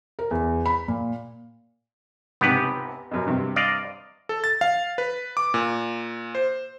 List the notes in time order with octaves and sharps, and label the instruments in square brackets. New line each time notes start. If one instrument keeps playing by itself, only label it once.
[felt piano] A#4
E2
B5
A#2
[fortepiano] C#2 G#2 C3 [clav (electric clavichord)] B3 G4 B4
[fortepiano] F#2 B2
G2 C3
[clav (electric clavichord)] D5 D#5 F5
[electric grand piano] A4
A6
F5
B4
D6
A#2
C5